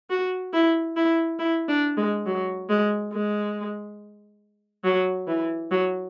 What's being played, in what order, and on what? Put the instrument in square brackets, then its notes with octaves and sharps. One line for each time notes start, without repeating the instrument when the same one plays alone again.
[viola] F#4
E4
E4
E4
D4
G#3
F#3
G#3
G#3
F#3
E3
F#3